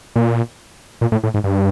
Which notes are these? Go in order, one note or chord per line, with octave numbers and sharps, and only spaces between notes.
A#2
A#2
A2
A2
G#2
G2